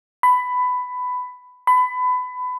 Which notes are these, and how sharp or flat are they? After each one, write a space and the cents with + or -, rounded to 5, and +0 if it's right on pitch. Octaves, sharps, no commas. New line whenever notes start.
B5 +15
B5 +25